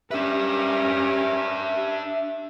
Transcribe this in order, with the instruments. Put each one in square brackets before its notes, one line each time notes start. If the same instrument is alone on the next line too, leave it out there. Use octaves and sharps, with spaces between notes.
[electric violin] C#4 A#4 [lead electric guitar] D4 B4 [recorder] G4 [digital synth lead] E5